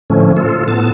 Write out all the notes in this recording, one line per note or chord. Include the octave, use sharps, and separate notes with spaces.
A2 D3 F3 A3 C#4
F4 A4
A2 B3 A5